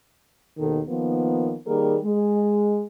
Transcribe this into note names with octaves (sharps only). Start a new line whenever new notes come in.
D#2 B2 D#3 A4
D#3 F3 A#3 B3
D#3 G3 A#3 G#4 A#4
G#3